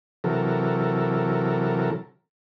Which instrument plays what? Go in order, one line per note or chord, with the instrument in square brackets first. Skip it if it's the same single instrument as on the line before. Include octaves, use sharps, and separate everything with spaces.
[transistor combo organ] C3 E3 F#3 A4 A#4